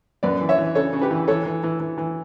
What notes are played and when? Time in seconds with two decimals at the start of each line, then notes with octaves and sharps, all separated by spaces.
0.23 F#2 B4 D5
0.41 E3
0.49 C#5 E5
0.58 E3
0.75 C#3 A4 C#5
0.93 C#3
1.01 G4 B4
1.11 E3
1.28 E3 A4 C#5
1.46 E3
1.63 E3
1.80 E3
1.98 E3